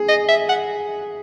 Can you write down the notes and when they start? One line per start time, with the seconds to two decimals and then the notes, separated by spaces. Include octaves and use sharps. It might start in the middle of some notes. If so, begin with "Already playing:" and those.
Already playing: G#4
0.08 D#5
0.29 E5
0.49 F#5